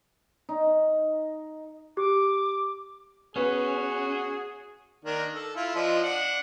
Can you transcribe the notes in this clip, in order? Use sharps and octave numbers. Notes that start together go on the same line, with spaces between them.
D#4
G4 D6
B3 C#4 F#4 G#4 B4
D#3 A#3 D4
A4
E4 F4
F3 D4 D#5
D4 F#5